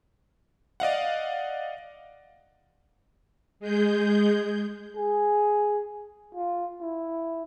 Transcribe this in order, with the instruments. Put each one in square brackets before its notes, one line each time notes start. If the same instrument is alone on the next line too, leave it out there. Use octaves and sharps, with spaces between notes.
[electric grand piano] D5 D#5 F5 F#5
[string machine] G#3 G#4 G6
[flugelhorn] G#4
F4
E4